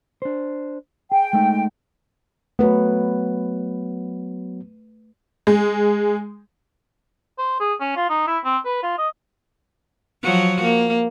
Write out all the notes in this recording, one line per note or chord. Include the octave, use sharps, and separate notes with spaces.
D4 C5
G#4 G5
G#3 A3 D#4
F#3 A3 B3 B4
G#3
C5
G#4
C#4
F4
D#4
E4
C4
B4
F4
D#5
F3 F#3 F#4
A#3